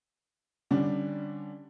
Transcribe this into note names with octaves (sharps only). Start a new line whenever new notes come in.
D3 G3 C#4 D4